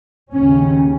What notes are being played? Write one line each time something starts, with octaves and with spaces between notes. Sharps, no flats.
D#2 C#3 C#4